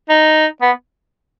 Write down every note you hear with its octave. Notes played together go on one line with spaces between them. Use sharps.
D#4
B3